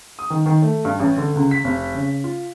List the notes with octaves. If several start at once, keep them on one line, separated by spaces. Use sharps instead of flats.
D#6
D#3
D#3
A3
G2
A1
D3
C#2
B6
F1
C#3
F4